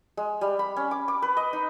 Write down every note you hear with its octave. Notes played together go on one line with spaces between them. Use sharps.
G#3
G3
B5
C#4
D6
D6
B4
D#5
D#4